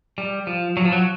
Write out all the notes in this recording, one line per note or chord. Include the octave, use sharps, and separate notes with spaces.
G3
F3
F#3
F3
F#3